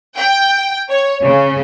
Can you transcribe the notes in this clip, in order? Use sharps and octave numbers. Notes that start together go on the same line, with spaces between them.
G5
C#5
C#3